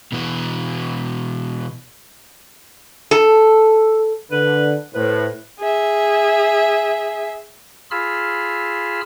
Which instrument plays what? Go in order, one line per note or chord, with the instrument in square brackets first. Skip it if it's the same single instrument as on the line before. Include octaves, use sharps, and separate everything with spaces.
[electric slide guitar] B2 E3 B3
[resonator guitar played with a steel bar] A4
[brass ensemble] D3 [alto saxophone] B4
[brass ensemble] A2 C5 [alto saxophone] B4
[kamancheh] G#4 E5
[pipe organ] F4 G#4 B5 E6 F6